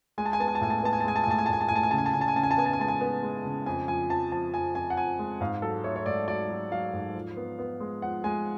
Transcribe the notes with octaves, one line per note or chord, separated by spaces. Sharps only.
G#3 G#5
A5
G#5
B3 A5
G#5
A5
A2 G#5
A5
G#5
B3 A5
G#5
A5
G#3 G#5
A5
G#5
A2 A5
G#5
A5
A2 G#5
A5
A2 G#5
A5
G#5
C#3 A5
G#5
A5
C#3 G#5
A5
G#5
C#3 A5
G#5
A5
B3 G#5
A5
G#5
G#3 A5
G#5
B3
G#3
C#3
F2 G#5
F3 G#5
F3 A5
F3 A5
F2 G#5
F2 G#5
F#5
F3 G#5
G#3
G#2 F5
F#3 A4
A3 C#5
C#5
G#2 D5
F#3 D5
F#3
F#3 F5
G#2
F3
B3
B3
G#3
F3 F#5
G#3 G#5